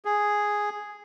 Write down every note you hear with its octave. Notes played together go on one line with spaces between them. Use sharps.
G#4